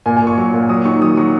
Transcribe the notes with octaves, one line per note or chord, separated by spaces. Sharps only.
A#2 G#5
G#5
A#2
C#6
F#3 C#6
A#2
F#3 D#6
D#3 C#6
F#3 D#6
F#3 C#6